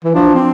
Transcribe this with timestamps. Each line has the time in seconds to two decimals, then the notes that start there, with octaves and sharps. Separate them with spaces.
0.04 E3
0.14 F3 D4
0.35 C4